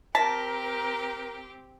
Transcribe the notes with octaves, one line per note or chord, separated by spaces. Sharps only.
C4 G4 A#4 G5 A5 A#6 B6